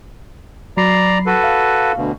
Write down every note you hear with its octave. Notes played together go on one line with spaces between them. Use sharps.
F#3 D5 A#5 B5 C7
F#4 A4 B4
F5
D2 B2